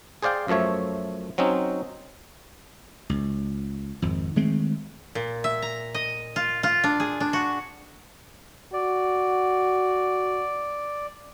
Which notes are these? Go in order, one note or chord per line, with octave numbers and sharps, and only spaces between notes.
G#4 C5 D5 F5 G5
F#2 F3 A3 C#5 E5
F#3 C4 C#4 D#4
C#2
G#1 F2
D#3 G#3 A3 C4
A#2
E5
A#5
D#5
F4
F4
D4
G#4
D4
F#4
F#4 D5